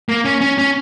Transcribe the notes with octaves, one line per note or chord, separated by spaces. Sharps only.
A#3
C#4
C#4
C#4